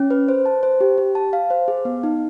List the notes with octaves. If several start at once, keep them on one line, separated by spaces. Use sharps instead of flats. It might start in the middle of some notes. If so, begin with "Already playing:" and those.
Already playing: C#4
B4
C5
A5
C5
G4
G4
A5
F5
C5
G#4
B3
D#4